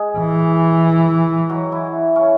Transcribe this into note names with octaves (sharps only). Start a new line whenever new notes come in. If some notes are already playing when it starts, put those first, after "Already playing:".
Already playing: G#3 G#4
E3
F#3 F#4
E3 E4
C#3 C#4